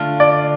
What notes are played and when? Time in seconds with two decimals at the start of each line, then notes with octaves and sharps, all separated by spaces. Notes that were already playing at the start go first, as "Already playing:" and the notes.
Already playing: D3 A3 D4 F4
0.20 D5